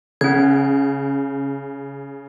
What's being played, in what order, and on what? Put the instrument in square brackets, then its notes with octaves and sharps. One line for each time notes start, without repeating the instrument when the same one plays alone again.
[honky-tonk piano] C#3 [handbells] C#4 G#6